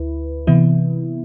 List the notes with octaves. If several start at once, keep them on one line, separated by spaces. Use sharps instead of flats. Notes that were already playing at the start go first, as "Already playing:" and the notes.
Already playing: D2 E4 B4
C3 E3 B3 E4